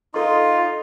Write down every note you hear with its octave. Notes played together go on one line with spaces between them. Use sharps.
D#4 F4 A4 F5 C6